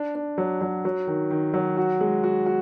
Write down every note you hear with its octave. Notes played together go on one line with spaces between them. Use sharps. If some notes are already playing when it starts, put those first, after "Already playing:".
Already playing: D4
D4
F#3
F#3
F#3
D#3
D#3
F#3
F#4
G#3
F#4
F#4